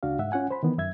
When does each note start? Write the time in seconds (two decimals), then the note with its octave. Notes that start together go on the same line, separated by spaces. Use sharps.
0.03 C#2 D4 F#4 F5
0.19 G#2 E5 F#5
0.32 C#4 F4 F#5 G#5
0.51 C5 B5
0.63 D#3 E3 B3
0.78 F#2 E5 G#6